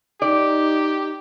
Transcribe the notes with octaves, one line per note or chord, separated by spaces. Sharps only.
D#4 G4 D5